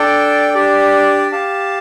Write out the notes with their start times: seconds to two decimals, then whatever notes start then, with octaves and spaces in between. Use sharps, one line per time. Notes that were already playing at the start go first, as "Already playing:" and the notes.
Already playing: D4 A4 D5 G5
0.54 D4 G4 D5
1.32 G4 F5 A5